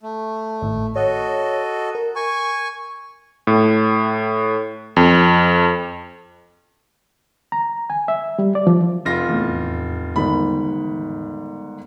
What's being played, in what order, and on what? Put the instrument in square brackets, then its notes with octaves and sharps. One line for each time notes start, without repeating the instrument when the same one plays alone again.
[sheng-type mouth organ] A3
[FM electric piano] G#1 A2
[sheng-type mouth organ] F#4 A4 D#5 [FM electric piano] C#5
[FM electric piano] A#4
[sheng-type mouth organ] G#5 C#6
[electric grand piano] A2
F2
[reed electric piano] A#5
G#5
E5
G3
D5
F3
[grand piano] F1 F4 A#6
[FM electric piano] E2 A2
[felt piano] G1 G#2 D#3 [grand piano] B5